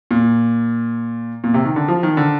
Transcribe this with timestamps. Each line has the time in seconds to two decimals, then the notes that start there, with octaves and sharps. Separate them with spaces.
0.11 A#2
1.44 A#2
1.54 C3
1.65 D#3
1.76 D3
1.88 F3
2.03 D#3
2.17 D3